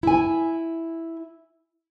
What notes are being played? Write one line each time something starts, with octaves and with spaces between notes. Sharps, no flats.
E4 G#5